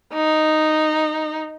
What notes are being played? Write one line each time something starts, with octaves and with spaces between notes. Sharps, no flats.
D#4